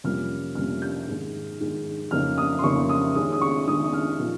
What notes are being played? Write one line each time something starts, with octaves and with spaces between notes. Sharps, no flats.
F2 C3 G3 A#3 C#4 F6
F2 C3 G3 A#3 C#4 F6
G6
G#2 D#3 G#3
G#2 D#3 G#3
F2 C#3 F3 A#3 D#4 F6
D#6
C6
F2 C#3 F3 A#3 D#4 C#6
D#6
D#3 G#3 C#4 D#6
D#6
C#6
D#3 G#3 C#4 D#6
D#6
F6
A#2 F3 A#3 D#4